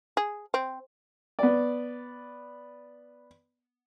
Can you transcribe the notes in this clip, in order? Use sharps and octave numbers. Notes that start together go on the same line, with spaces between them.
G#4
C4
B3 D5